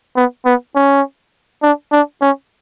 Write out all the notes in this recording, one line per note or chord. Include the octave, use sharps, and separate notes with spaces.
B3
B3
C#4
D4
D4
C#4